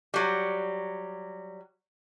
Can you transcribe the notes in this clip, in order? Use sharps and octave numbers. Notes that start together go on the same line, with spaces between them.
F#3 G3